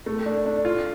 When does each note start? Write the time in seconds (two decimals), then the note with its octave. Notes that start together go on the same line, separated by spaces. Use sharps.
0.06 A3
0.26 D4
0.46 D4
0.65 F4